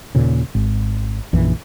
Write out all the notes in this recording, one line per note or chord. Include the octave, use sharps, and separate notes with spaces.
D#2 A#2 C#3
G#1
A#1 F#2 E3